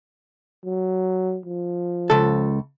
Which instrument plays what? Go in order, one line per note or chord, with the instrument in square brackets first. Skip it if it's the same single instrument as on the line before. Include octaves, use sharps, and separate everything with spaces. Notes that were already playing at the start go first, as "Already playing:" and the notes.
[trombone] F#3
F3
[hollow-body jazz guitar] C#2 A4